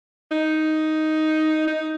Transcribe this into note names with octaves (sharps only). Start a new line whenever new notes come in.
D#4
D#4